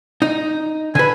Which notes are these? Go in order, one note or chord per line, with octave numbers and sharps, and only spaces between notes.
D#4
D3 B4 G#5